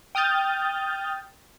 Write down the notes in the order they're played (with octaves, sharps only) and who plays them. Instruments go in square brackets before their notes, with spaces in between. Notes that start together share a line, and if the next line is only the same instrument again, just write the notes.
[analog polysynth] G5 D#6 F6 G6 A6